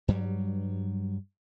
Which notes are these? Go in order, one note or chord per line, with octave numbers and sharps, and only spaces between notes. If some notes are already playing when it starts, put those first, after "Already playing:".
G2 F#3 G3